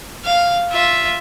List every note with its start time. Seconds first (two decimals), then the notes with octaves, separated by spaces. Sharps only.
0.25 F5
0.71 F4 E5